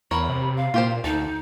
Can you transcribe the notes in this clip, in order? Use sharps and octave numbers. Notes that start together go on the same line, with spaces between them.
E2 A#4 C#5 B5
C3
F5
A#2 F4 G4 C5
D2 D#4 A4